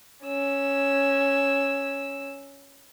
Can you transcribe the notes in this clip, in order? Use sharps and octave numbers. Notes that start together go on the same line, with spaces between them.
C#4 E6